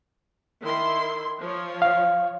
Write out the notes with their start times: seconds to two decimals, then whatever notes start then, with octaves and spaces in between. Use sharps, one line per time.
0.62 D#3 E4 C6
1.40 F3 C#5
1.82 F5